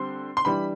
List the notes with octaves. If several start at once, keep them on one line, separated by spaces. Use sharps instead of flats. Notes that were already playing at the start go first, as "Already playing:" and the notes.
Already playing: D3 G3 C4 C6
C6
E3 G3 D4 B5